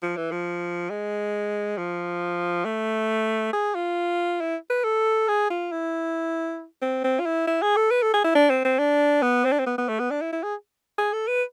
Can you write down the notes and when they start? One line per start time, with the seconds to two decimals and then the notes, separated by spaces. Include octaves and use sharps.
0.02 F3
0.17 E3
0.32 F3
0.90 G#3
1.78 F3
2.65 A3
3.53 G#4
3.75 F4
4.41 E4
4.70 B4
4.84 A4
5.28 G#4
5.50 F4
5.72 E4
6.82 C4
7.04 C4
7.20 F4
7.26 E4
7.47 E4
7.62 G#4
7.77 A4
7.91 B4
8.02 A4
8.14 G#4
8.24 E4
8.35 D4
8.50 C4
8.65 C4
8.79 D4
9.22 B3
9.45 C4
9.52 D4
9.59 C4
9.66 B3
9.78 B3
9.89 A3
10.00 B3
10.11 D4
10.21 E4
10.32 E4
10.43 G#4
10.98 G#4
11.13 A4
11.28 B4